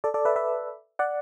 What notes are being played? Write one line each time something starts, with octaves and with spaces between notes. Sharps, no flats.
A4 D5
A4 D5
B4 E5
B4 E5
D5 F#5